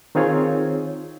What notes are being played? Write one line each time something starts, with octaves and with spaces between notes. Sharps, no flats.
D#3 C4 D#4 F4 G#4 C#5